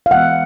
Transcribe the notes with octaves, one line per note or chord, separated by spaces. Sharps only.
F5
E3 G#3 B3 E5 F#5